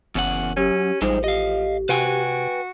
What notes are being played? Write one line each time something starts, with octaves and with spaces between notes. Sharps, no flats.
F#1 E2 C#4 F#5
F#2 C#4 G4
A1 F3 G3 G#3 D#4 C5
G4 D#5 F5
C3 F#4 B4 G5 G#5